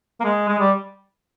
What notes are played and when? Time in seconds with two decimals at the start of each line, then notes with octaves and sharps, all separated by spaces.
0.20 A#3
0.24 G#3
0.48 G#3
0.59 G3